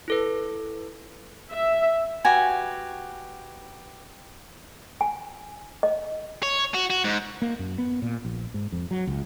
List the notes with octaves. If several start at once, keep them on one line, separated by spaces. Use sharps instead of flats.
E4 A4 B4
E5
F#4 G4 B4 G#5
G#5
D#5
C#5
F#4
F#4
G#2
A#3
F#2
B3
A#2
A#1
G#2
F2
F#3
C#2